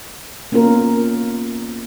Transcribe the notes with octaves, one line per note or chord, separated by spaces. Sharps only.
A#3 B3 C#4 F4 A#4